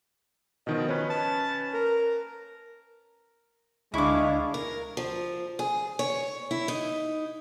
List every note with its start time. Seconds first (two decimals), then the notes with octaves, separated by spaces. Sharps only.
0.67 B2 D#3 F3 D#5
0.88 C#4 B4
1.10 A5
1.74 A#4
3.94 D2 G#3 D4 E4 F5 C#6 D6
4.54 A#4
4.97 F3
5.59 G#4
5.99 C#5
6.51 E4
6.68 D#4